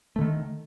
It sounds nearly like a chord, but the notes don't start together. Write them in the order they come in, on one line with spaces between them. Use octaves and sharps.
A3 D3 D#3